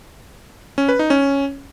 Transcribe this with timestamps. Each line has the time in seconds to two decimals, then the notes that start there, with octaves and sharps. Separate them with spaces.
0.78 C#4
0.89 B4
0.99 D#4
1.10 C#4